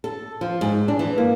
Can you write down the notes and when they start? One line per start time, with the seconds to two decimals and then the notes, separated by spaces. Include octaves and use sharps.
0.04 A4
0.41 F3
0.61 G#2
0.88 D4
0.99 E3
1.18 A#3